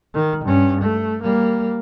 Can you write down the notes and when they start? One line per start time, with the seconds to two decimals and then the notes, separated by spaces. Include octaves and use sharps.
0.14 D#3
0.45 G2 C#4
0.81 A3
1.23 G3 A#3